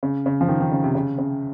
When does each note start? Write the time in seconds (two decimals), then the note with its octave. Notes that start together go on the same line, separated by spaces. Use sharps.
0.03 C#3
0.26 C#3
0.41 F3
0.48 D#3
0.61 D#3
0.72 C#3
0.84 C3
0.95 C#3
1.18 C#3